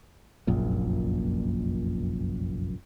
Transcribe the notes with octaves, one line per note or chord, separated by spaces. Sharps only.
F1 A#1 F#2 A#2